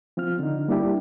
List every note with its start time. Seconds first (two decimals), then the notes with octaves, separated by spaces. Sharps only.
0.17 F3 C4 F4 F6
0.39 D3 D#4
0.68 G3 A#3 D4 E4 G4